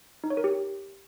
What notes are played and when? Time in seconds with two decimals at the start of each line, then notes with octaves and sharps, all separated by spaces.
0.24 D#4
0.30 C#5
0.37 A#4
0.44 G4